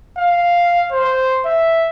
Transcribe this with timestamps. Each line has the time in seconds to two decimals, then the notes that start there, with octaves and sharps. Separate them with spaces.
0.17 F5
0.91 C5
1.45 E5